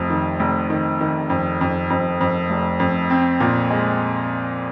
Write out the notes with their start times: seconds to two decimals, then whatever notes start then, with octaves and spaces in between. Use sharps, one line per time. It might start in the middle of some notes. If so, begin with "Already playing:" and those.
Already playing: F1 F2
0.10 D#3
0.40 F1
0.70 D#3
1.01 D#3
1.30 F2
1.61 F2
1.90 F2
2.21 F2
2.50 F1
2.80 F2
3.10 C4
3.40 A#2
3.70 G#3